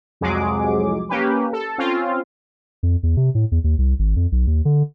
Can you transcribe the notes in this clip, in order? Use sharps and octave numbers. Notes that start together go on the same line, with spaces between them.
C2 F2 F#3 G#3 G#4 D6
A#3 C#4 G4 B4
A4
C4 C#4 F4
F2
E2
C3
A2
E2
D#2
C2
G#1
F2
B1
D#2
D3